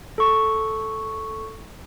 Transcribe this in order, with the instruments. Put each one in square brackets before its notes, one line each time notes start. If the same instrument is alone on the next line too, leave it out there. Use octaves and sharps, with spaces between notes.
[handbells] A4 C#6